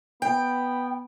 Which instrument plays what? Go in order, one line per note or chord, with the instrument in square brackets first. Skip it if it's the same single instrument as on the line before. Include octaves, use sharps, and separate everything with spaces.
[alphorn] B3 [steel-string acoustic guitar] G5